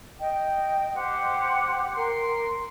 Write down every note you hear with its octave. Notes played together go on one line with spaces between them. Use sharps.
D#5 G5
G4 C5 F#5 G5
A#4 C6